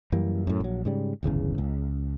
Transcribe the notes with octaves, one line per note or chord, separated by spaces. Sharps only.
F#2 E3 G3 A#3
F#2 A2
A#1 F#3
G#2 C#3 G3
D1 G1 E2 C#3
C#2